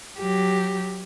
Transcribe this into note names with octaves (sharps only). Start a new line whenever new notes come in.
F#3 G4